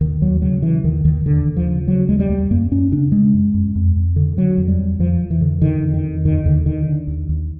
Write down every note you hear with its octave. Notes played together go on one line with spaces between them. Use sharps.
D#2 D#3
D#2 F#3
C#3 F#3
C#3 E3
D#2 D#3
D#2 D#3
D#2 D3
D#2
F3
C#3
C#3 F#3
D#2 G#3
G3
D#2
F#2 A#3
F#2 C#4
C#3 D4
C#3 G#3
F#2
F#2
F2
F2
D3
D3 F#3
F2
G3
F2
F2 F3
F2
E3
D3
D3 D#3
F2
D#3
F2
D#2 D#3
D#2 D3
D3 D#3
D3
D#2
D#2